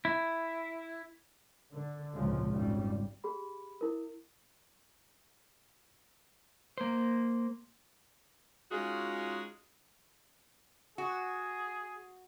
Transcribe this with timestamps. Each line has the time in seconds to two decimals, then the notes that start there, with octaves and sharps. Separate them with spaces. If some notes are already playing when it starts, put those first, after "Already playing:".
0.05 E4
1.74 D3
2.15 G#1 C#2 A#2 C#3 F3 G#3
2.51 G#1 F2 C#3 G3
3.24 G4 G#4 B5
3.81 E4 A#4
6.78 A#3 C5
8.71 G#3 C#4 D#4 F4 F#4 G#4
10.98 F#4 G#4